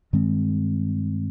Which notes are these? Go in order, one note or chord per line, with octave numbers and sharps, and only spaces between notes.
G2 D#3 G#3 C4